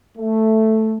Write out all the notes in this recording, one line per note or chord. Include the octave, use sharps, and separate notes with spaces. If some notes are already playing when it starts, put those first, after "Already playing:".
A3